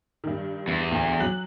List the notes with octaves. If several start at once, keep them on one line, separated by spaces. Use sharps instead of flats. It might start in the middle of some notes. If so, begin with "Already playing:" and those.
G2 D#3
E2
D2
F#3 F#6 F#7